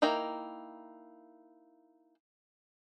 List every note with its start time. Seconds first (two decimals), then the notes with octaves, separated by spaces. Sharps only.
0.02 A#3 D#4 E4 G5 A#5